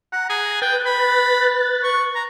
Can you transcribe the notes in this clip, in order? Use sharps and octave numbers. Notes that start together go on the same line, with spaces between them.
F#5 A#5
G#4
B4 G5 F#6 A6
B5
C#6
A#5